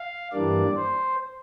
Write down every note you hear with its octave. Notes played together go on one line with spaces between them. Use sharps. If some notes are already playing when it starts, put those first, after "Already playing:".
Already playing: F5
G2 E3 G3 A#3 D4 D5
C5